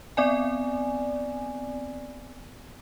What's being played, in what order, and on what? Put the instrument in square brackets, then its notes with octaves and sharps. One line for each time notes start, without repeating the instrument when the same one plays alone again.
[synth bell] B3 C4 D5 G#5